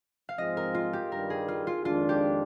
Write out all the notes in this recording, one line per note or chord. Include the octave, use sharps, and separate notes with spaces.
F5
G#2 F3 G#3 C4 D#5
A#4
F4
G4
G2 D#3 G3 A#4
G#4
F4
F4
F2 D#3 G#3 D4 F4
G4